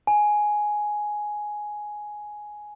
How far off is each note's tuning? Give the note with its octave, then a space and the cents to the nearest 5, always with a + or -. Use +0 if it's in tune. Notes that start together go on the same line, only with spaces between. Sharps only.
G#5 +10